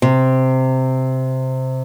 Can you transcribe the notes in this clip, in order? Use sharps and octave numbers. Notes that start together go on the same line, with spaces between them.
C3